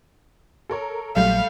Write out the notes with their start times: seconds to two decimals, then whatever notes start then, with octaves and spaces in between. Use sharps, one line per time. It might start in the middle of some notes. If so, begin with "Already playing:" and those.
0.69 A4 A#4 C#5
1.16 A#1 F#3 G3 A3 F5